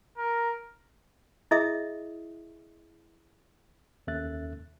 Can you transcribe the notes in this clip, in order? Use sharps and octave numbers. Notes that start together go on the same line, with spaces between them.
A#4
E4 G#4 D#5 E5 D#6
D#2 C#4 A4 E5 F#6 A6